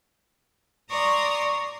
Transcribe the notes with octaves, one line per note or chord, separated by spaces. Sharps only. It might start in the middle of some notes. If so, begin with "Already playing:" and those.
D5 A#5 C6 C#6 D#6